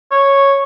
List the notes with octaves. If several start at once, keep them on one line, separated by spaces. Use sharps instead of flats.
C#5